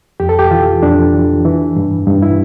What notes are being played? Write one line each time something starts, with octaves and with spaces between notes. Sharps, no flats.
F2 G4
A4
G4
E3 F4
F2 D4
E3
E3
G2
G2
E4